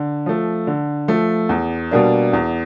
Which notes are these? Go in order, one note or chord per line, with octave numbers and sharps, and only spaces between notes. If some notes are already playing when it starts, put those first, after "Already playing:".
Already playing: D3
F3 A3
D3
F3 A3
E2
B2 G3 A#3 D4
E2